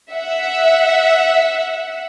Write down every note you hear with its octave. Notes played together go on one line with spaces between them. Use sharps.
E5 F#5